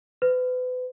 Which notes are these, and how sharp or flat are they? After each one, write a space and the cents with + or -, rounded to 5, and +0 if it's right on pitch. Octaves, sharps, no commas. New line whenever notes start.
B4 +35